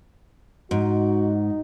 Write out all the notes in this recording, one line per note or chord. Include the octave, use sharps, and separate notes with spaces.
G#2 D#4 F#4